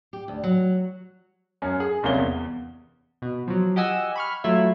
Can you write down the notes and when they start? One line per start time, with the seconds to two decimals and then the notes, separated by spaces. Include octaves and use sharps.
0.13 G4
0.28 D2
0.44 F#3
1.62 F#2 C#4 G#5
1.80 G#4
2.03 F#1 C2 C3 A#3 C#4 G7
2.18 E2
3.22 B2
3.48 F3 F#3
3.76 G4 D#5 F#5 G#5 E6
4.16 B5 C#6 F6
4.44 F#3 A3 E4 F4 E5